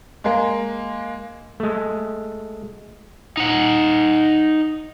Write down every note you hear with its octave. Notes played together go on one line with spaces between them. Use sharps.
G#3 A#3
G#3 A3
D#4 F#5